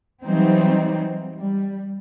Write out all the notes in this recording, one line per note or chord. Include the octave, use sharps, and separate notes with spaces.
E3 F#3 G3 C4 D#4
G3